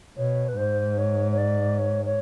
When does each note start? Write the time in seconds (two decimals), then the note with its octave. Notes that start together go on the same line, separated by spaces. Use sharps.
0.17 B2 C#5
0.48 B4
0.57 G#2 C5
0.98 C#5
1.32 C#5
1.38 D5
1.78 C#5
2.05 C#5